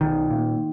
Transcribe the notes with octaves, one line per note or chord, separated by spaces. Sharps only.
B1 D#3
A#2